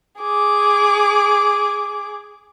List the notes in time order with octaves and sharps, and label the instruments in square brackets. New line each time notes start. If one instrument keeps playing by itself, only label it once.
[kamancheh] G#4 D6